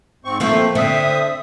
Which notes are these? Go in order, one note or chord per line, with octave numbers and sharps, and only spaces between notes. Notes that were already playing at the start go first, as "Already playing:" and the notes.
G#2 C4 C#6
F3 A3 A#3 C4
D3 C4 E5 D#6